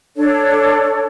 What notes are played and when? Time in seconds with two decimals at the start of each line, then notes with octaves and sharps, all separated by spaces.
0.16 D4 A4 C#5